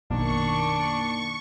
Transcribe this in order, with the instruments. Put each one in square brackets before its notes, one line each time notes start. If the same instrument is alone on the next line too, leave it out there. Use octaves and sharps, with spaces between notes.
[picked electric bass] A#1 F#2 B2 [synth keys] D#3 A#3 [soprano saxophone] D4 [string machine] C#6